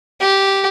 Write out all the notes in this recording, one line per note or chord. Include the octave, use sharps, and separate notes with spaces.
G4